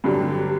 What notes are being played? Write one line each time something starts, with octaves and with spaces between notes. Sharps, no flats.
G2 D3 F#3 G4